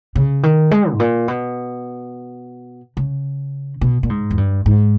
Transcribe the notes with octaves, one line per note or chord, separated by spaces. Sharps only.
C#3
D#3
G#3
G#2
A#2
B2
C#3
B2
A#2
G#2
E2
G2
G#2